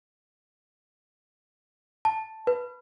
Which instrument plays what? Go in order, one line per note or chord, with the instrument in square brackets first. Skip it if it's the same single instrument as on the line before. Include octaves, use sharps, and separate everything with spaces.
[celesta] A5
B4